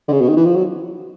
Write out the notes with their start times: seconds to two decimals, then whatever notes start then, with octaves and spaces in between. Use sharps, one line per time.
0.08 D3
0.12 C#3
0.21 B2
0.29 D#3
0.36 E3
0.45 F3
0.56 F#3